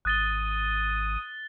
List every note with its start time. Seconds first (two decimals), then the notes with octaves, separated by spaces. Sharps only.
0.05 G#1 D#6 F#6 A6 G7